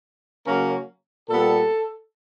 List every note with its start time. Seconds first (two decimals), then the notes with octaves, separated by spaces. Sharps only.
0.45 C#3 F#3 A#3 C#4 A#4
1.30 A#2 G3 B3 A4